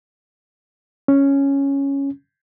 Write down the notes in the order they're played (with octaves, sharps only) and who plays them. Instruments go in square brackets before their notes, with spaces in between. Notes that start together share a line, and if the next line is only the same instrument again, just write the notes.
[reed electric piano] C#4